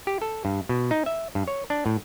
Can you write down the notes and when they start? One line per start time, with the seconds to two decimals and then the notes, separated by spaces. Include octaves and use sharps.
0.07 G4
0.22 A4
0.45 G2
0.69 B2
0.91 D#4
1.06 E5
1.35 G2
1.48 C#5
1.70 D4
1.86 A2